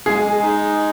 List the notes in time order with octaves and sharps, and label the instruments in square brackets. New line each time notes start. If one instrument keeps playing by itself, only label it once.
[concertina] G#3 [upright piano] G#4
[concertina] D#4